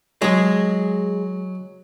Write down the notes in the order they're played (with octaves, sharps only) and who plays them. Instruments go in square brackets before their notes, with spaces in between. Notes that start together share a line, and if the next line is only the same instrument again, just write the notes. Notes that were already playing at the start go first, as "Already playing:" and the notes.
[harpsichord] F#3 [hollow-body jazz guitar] G#3 G#4